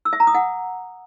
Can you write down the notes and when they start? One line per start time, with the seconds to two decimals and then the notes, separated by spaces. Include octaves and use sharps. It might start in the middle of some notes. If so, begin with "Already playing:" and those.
0.05 E6
0.13 E5
0.20 A#5
0.27 D#6
0.35 F#5